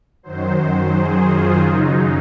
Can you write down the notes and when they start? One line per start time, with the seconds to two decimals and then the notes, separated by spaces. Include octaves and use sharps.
0.23 F#2 D#3 F#3 C5
0.92 G#4
1.28 F4
1.62 F#2 C#3 F#3 D#4